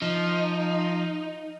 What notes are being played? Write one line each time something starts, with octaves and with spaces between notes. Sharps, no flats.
F3 D#4